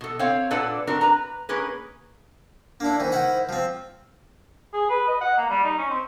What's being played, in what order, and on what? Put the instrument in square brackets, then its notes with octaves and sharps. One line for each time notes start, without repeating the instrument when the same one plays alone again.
[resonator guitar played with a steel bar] B2 A4
C4 C#5 F5
A#2 D4 A4 B4 D5 F#5
C4 D4 F#4 A#4
B4 A#5
A#3 C#4 G#4 B4
[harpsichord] A#3 E4 [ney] D4
[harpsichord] D#3 E3 [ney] C5
[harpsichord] D#3 E4 F#5
F3 C4
[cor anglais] G#4
B4
D#5
F#5
A#3
G3
D#4
C#4
C4